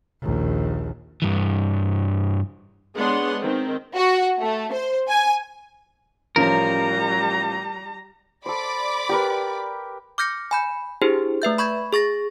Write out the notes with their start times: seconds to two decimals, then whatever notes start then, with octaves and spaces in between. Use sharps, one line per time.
0.22 A#1 D#2
1.22 G2 E3
2.95 G#3 B3 D4 C#5 F#5 C6
3.41 D#3 C4
3.95 F#4
4.41 A3
4.73 C5
5.09 G#5
6.36 A1 F3 G3 C#4 A#4 A#5
8.46 A4 C5 D5 B5 D6
9.09 G4 A#4 B4
10.18 D6 F6 G6 A#6 C#7
10.51 G#5 B5 G6
11.02 D4 E4 G4 G#4 C5
11.42 A3 B4 E5 G6
11.58 B5 C#6 G6 G#6
11.93 G#4 C#6 A6 A#6